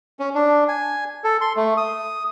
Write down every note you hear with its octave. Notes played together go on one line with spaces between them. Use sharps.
C#4
D4
G#5
A4
C6
A3
D#6